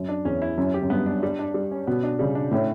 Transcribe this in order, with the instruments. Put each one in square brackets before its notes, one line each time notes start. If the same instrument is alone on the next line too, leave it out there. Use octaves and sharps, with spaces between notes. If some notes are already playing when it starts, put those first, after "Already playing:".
Already playing: [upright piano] F#2
[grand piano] D4
[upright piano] E2 [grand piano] C#4
[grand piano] E4
[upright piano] F#2 [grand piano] C#4
[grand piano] G4
[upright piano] F#2
[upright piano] G2 [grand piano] B3
[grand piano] D4
G3
D4
G3
C#4
[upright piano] B2 [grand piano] B3
[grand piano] D4
[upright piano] C#3 [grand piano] G3
[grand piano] D4
[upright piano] A2 [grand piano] C#4